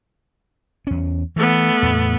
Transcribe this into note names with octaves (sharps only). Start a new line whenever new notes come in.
E2 C#4
E3 A3 B3
E2 A2